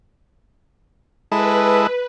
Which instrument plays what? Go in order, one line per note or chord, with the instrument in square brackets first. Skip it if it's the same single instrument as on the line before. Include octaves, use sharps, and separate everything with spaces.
[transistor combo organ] G#3 E4 A4 [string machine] B4